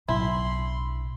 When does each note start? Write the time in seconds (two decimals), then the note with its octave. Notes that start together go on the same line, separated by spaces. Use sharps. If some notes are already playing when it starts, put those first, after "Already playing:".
0.08 B1 A2 D4 E4 B5 C6